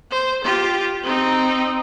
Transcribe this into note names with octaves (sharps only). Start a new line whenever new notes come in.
C5
F4 G4
C4 D#4